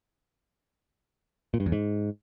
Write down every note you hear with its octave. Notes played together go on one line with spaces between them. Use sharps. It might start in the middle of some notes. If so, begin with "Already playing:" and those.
A#2
G2
E2
G#2